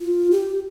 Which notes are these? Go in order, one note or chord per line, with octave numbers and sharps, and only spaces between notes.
F4
G4